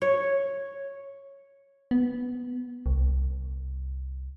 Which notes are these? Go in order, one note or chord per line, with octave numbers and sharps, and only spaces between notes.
C#5
B3
C2